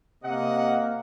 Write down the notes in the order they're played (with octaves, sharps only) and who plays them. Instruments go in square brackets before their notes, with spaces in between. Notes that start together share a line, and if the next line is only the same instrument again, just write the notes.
[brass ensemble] C3 D#5 F#5 [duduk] A#3